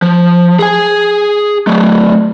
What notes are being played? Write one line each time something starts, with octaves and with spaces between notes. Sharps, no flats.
F3
G#4 G#5
F#3 A3